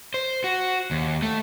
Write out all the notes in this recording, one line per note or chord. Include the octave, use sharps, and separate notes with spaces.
C5
F#4
D#2
A3